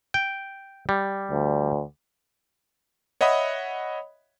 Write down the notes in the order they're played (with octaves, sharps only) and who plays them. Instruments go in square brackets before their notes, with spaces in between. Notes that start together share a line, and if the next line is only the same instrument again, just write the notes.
[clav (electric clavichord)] G5
G3
[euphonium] D2
[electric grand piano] C#5 D#5 E5 F#5 B5 D#6